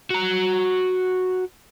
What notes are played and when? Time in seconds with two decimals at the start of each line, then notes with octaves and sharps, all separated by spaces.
0.10 F#4 A#5